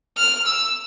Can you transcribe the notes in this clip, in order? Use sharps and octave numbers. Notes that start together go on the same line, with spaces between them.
F6
E6